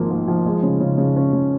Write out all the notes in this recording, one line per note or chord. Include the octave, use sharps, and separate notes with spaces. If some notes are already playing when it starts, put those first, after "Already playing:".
Already playing: G#1 G#2 F3 A#3
A#3
F3
G#3
C#3
C#3
C#3
C#4
C#3